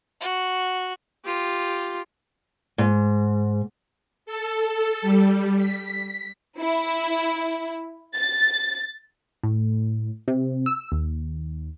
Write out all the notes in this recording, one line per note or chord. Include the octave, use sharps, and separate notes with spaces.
F#4
F4 G4
G#2
A4
G3
B6
E4
A6
A2
C3
E6
D#2